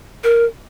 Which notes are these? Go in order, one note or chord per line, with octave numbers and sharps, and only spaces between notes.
A#4